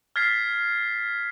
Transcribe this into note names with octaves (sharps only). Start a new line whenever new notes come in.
F6 G#6 A6 B6 C7